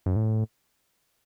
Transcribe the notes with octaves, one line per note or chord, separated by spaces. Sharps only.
F#2
A2